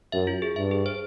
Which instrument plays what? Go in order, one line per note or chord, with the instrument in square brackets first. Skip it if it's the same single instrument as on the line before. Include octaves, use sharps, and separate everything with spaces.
[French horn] F#2 [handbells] E5
[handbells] F4
G#4
[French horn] G2 [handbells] E5
[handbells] G#4
C5